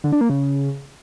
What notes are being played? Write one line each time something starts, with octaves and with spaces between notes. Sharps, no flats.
D3
D4
A#3
C#3